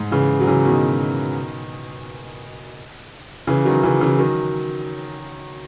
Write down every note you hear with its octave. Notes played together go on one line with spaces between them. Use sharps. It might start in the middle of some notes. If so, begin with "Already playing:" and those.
Already playing: G#2
C#3 E3
F#3
C#3 E3
B2 D#3
C#3 E3
D#3 F#3
C#3 E3
C#3 E3
D#3 F#3